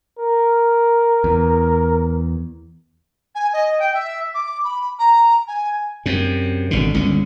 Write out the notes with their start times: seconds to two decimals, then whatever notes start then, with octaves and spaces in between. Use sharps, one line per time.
0.19 A#4
1.24 E2
3.35 G#5
3.53 D#5
3.79 G5
3.94 E5
4.34 D6
4.64 B5
4.99 A#5
5.47 G#5
6.06 F#2 C3
6.71 G#1 B2 D3
6.94 G1 C#2 D3 C#4